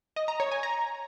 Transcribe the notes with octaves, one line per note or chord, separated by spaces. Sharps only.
D#5
A#5
C#5
G#5
A#5